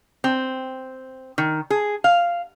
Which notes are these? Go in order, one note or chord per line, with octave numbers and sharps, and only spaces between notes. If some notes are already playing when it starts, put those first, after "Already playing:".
C4
D#3
G#4
F5